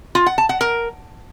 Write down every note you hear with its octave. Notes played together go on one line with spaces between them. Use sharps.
F4
F#5
A5
F#5
A#4